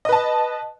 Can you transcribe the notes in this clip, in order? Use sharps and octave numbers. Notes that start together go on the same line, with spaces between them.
B4 D#5 A5